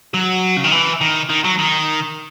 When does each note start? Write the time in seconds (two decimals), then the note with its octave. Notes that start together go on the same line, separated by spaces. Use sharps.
0.14 F#3
0.57 C#3
0.64 D#3
0.72 E3
1.01 D#3
1.29 D#3
1.44 F#3
1.59 D#3